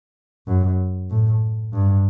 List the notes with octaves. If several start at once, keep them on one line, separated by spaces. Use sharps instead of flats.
F#2
A2
G2